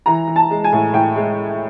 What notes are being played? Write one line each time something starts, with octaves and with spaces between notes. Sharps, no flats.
E3 A#5
E3
A5
G#3
G#5
A2
A2 G5
G#3